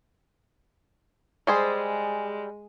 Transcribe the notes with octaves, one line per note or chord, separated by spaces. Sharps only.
G3 G#3 G#4 C5